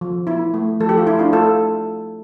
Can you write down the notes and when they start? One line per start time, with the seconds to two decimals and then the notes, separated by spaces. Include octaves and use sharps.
0.01 F3
0.27 B3 E4
0.54 A3
0.80 F3 A4
0.89 G4
0.97 F4
1.07 A3 E4
1.19 D4 F4
1.33 A3 F4 A4